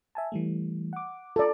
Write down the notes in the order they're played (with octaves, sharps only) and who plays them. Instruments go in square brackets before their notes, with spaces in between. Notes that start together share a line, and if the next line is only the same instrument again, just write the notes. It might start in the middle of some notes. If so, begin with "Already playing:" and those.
[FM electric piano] E5 G#5 A5
E3 G3 A3
F#5 D6
[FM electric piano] F4 A#5 [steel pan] A4 D5